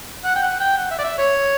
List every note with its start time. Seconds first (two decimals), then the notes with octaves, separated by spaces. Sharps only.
0.25 F#5
0.36 G5
0.42 F#5
0.60 G5
0.77 F#5
0.91 E5
0.99 D5
1.04 E5
1.18 C#5